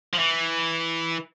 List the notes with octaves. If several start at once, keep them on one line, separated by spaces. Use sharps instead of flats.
F3
E3